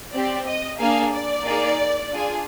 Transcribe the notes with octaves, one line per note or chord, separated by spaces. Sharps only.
C4 G4 D5
D#5
A#3 D4 G#4 F5
D5
A#3 D#4 G#4
D4 F4 G#4